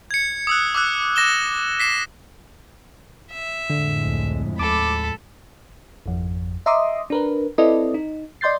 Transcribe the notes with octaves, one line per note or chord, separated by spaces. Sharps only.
G#6 C#7
D#6 E6 F#6
D6 E6 F#6
D6 A#6 E7 G7
B6 C7 E7
E5
F2 A2 D3 G#3
C#2
D#2 A4 B5 D6
G#1 F2
D#5 E5 A#5 C6 D6 D#6
D4 A#4 B4
C4 E4 A4 B4 D5 D#5
D#4
D5 D#5 C6 G6 A6 C7